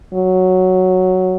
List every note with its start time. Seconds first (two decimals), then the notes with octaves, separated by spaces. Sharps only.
0.14 F#3